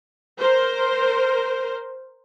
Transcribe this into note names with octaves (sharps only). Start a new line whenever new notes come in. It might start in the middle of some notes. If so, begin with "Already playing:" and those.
A#4 C5